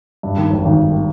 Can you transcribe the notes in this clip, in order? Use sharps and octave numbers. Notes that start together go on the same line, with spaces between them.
G2
D#3
G#1
G#1
G2
D#3